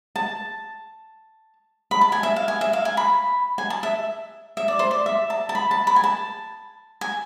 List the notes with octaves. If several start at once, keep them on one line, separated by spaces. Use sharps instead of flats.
A5
B5
A5
G#5
E5
F5
G#5
E5
F5
G#5
B5
G#5
A5
E5
E5
D5
C5
D5
E5
A5
A5
B5
A5
B5
G#5
A5
G#5